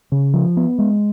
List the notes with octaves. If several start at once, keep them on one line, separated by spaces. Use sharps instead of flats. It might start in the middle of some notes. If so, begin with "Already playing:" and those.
C#3
F3
B3
G#3